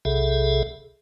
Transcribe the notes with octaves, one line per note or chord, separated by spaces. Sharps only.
B1 C3 G#4 A4 E5